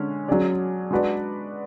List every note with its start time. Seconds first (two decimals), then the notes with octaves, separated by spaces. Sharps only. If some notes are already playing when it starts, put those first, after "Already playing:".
Already playing: D3 G#3 C#4
0.28 F#3 C#4 G#4 D5
0.91 G#3 D4 F#4 B4 D5